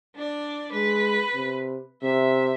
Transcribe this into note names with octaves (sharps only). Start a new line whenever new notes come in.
D4 D5
G#3 B4
C3
C3 E5